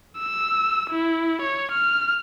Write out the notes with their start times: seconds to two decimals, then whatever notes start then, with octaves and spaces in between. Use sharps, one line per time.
0.19 E6
0.91 E4
1.42 C#5
1.72 F6